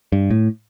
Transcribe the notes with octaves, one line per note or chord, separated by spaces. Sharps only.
G2
A2